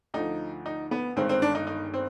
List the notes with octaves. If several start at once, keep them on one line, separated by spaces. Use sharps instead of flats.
D2 D3 F3 D#4
D#4
B3
G1 G2 D#3 G#3 C4
C4
D4
D#4
D#4
C4